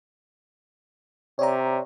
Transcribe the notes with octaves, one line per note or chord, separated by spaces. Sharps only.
C3 C#5 D5 A#5